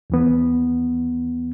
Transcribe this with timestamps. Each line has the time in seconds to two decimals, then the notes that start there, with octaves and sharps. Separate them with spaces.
0.10 D#2 E3 B3